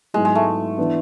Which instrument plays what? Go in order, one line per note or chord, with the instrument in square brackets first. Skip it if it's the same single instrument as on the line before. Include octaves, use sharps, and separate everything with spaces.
[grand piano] G#2 F#3 B3 E4 [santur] G#3
[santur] G#3
A3
[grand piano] E3 B3 D4